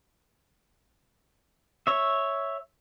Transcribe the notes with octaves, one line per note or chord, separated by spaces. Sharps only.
C#5 E5